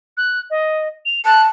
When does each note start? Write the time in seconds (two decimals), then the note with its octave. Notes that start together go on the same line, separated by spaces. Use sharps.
0.17 F#6
0.50 D#5
1.06 F7
1.25 A5 F#6